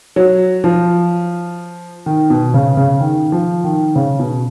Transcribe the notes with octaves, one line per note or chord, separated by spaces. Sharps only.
F#3
F3
D#3
B2
C#3
C#3
D#3
F3
D#3
C#3
B2